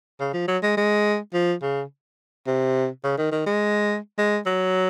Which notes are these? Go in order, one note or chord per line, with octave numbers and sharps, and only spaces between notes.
C#3
F3
F#3
G#3
G#3
F3
C#3
C3
C#3
D#3
D#3
G#3
G#3
F#3